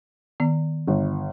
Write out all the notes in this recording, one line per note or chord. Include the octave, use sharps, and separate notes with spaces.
D#3 B3
G1